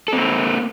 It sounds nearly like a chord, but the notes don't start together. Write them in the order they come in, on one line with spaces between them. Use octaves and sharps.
A4 C4 A#3